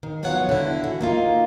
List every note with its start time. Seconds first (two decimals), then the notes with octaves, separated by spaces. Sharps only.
0.03 D#3
0.23 F#3 B3 F4 C#5 F#5
0.49 D3 E4
0.84 E3 F#4
1.01 A#3 D#4 F4